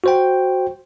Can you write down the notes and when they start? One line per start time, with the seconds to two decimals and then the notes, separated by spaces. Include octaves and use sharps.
0.04 F#4 C5 G5